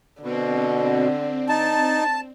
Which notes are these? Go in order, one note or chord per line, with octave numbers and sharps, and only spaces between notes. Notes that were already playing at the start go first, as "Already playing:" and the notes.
B2 D3 C4
D#4 A5